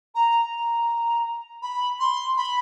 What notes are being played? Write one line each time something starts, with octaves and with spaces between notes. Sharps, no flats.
A#5
A#5
B5
C6
B5